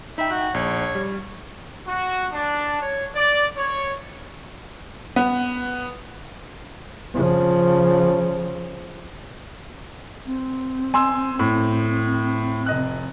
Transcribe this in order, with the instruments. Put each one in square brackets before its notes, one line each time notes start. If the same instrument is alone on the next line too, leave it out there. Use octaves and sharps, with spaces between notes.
[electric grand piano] D#4 G5 [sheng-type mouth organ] E5 B5
[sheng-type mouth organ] F#4 F#6
[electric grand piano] A#1 [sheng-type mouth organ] C#5
[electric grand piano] G3
[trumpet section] F#4
D4
C#5
D5
C#5
[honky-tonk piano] B3
[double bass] C#3 F3
[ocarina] C4
[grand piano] G#5 C6 E6
A2
F1 D#5 F#6